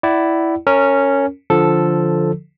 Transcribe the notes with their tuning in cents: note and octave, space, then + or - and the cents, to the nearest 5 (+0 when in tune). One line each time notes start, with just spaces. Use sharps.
E4 +0 D5 +0 F#5 +35
C#4 +0 A#4 -25
D3 -5 F3 +0 A4 +0